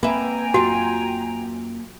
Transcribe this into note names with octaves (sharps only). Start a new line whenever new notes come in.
A#3 C4 B4 E5 G5 G#5 A#5
F#2 F4 F#4